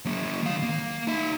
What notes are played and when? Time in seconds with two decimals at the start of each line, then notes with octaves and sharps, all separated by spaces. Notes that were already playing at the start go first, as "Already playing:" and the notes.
0.05 F#3 A#3
0.43 D#3 F5
0.62 A#3
1.07 D#4 E5